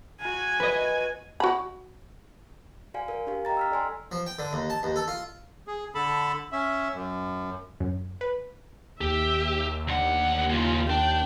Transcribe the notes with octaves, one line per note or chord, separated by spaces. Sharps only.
F#4 G#5
B4 D#5
F#4 B5
F#4 D5 F5 G#5
A#4 F5 G#5
D4 G4 F5
D#5 G5 A#5 A6
E6 F6 B6
A4 D5 G#5 C6
F3
G5
D3
D#2
A5
D#2
A4
F4
G#4
D3 A4 A5 B5
C#4 E5
F#2
F#2
B4
D#2 G4 E5
D2 D4 F#5
C#3 A#3 F4
D4 G5